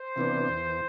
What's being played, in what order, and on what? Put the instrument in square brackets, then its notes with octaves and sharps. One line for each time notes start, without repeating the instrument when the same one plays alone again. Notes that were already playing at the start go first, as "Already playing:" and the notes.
Already playing: [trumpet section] C5
[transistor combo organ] C3 E3 B3 D4
E2